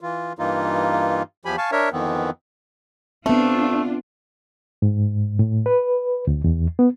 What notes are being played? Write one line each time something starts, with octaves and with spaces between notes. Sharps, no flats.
E3 F4
G2 E3 A#3 D#4 F4
E2 F3 G4 G#5 B5
F5 G#5 A5 C#6
D4 A#4 C#5 E5
F2 D#3 E3 B3 C4
A3 B3 C4 D4 F4
G#2
A2
B4
D2
E2
B3